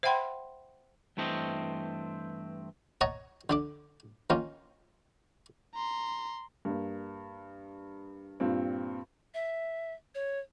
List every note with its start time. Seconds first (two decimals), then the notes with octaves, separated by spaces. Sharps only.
0.03 C5 E5 F#5 G5 B5 C6
1.17 G2 E3 A3 C4 C5 D#5
3.01 C#5 D#5 F#5 A5 A#5
3.50 D3 D4 D6
4.30 D#3 A#3 C#4 F4
5.75 A#5 C6
6.65 G2 A#3
8.40 G2 A#2 C4
9.34 E5
10.15 C#5